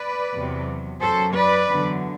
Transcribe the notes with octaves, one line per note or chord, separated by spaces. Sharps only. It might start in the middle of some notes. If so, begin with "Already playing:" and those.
Already playing: B4 D5
E2 C3 F#3
F#2 F#3 A4 C5
B4 D5
E2 D3 F#3